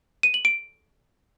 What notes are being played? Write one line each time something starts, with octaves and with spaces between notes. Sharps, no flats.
D#7
F#7
D7